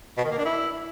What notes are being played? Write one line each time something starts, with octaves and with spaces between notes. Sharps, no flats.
B2
D#3
A#3
D4
E4